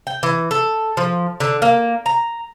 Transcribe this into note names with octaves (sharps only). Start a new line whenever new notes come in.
G5
E3
A4
F3
D3
A#3
A#5